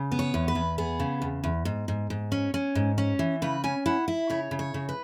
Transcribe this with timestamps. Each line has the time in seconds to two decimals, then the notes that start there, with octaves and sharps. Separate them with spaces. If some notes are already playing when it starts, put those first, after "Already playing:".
Already playing: C#3
0.12 B3
0.19 C#5
0.34 E2
0.48 B4
0.55 E2
0.78 B3 G#4
1.00 C#3
1.22 E2
1.44 E2
1.65 G#2
1.88 G#2
2.10 G#2
2.32 C#4
2.54 C#4
2.75 G#2
2.98 C#4
3.19 E3
3.42 C#3 B4
3.64 C#4 G#5
3.86 E4 F#5
4.08 E4
4.30 C#3 C#5
4.51 C#3
4.59 C#5
4.74 C#3
4.89 B4